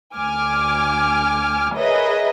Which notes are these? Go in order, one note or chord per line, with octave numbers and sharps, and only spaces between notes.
D2 G#5 D6 F6
G#4 A#4 B4 C#5 D#5 E5